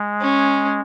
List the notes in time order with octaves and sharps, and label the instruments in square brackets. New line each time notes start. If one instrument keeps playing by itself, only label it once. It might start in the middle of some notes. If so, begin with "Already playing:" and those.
Already playing: [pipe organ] G#3
[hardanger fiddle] C#4